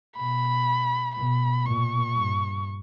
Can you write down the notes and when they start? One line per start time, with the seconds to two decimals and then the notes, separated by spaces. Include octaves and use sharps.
0.16 B2 B5
1.16 B2 B5
1.65 A#2 C#6
2.14 G2